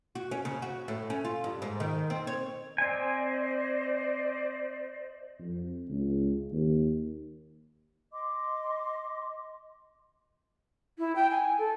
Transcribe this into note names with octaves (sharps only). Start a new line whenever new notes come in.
F#4
C#4
C#3
F#4
A2
C#4
F4
G2
G#2
D#3
C4
C#5
C4 C5 D5 D#5 G#5
F2
C#2
D#2
D#5 C6 D6
E4
G5
G#5
A4